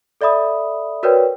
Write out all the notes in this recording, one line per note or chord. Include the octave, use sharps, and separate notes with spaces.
A4 D5 E5 B5 D#6
F#4 A#4 B4 C#5 D5 G5